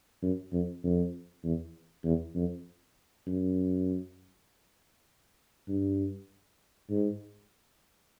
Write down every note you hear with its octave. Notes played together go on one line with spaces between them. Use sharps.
F#2
F2
F2
E2
E2
F2
F#2
G2
G#2